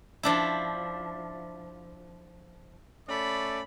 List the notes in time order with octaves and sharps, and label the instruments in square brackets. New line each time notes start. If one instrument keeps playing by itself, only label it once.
[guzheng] F3 D4 E4
[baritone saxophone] A3 [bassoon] C#4 [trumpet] D5 [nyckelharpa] B5